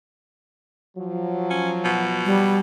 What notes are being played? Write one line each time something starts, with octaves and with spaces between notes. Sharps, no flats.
F3 F#3
C#4
B2
G3